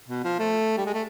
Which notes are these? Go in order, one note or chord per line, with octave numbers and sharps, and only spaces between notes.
B2
F3
A3
G3
G#3
A3